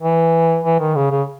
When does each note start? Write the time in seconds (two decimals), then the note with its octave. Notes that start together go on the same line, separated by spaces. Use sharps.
0.01 E3
0.65 E3
0.80 D#3
0.96 C#3
1.11 C#3